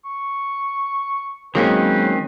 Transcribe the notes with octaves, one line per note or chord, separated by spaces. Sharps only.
C#6
D#3 F#3 G#3 A#3 C4 C#4 B4